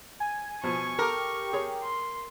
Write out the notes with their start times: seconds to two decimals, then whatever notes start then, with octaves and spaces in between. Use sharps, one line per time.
0.20 G#5
0.64 B2 F3 C#6
0.99 G4 A4 A#4
1.53 G#4 C#5
1.82 C6